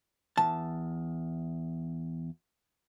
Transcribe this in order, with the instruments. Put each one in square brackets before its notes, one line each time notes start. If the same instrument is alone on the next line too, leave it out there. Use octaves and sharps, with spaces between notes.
[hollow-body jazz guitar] E2 A5